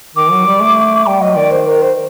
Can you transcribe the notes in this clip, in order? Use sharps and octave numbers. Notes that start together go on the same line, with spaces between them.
D#3 D6
F#3
G3
A3
G3 G5
F#3 D#5
D#3 D5
C5
A#4
C5